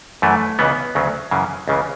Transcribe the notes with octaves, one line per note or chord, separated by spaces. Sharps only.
F#2 E3 A3
C#2 C#3 E3 B3
D2 C#3 F#3
F#2 C#3 E3
C#2 C#3 E3